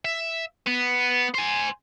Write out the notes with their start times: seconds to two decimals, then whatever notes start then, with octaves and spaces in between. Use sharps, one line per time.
0.05 E5
0.67 B3
1.34 C5 G#5